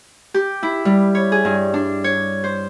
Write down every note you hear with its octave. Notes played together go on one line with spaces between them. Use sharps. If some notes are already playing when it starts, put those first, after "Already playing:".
G4
E4
G3
C#5
G#4
G2
D4
C#5
C5